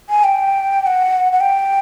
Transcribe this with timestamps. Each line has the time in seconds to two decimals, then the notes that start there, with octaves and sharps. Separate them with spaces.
0.09 G#5
0.24 G5
0.82 G5
0.86 F#5
1.32 F#5
1.41 G5